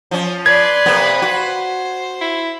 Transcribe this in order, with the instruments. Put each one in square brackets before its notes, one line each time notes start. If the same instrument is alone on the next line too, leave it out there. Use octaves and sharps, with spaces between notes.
[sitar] F3 C#4
[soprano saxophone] B4 [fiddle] D5 C6 [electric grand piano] G#6
[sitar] C3 A#3 B3
[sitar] F#4 [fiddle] C5
[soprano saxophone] E4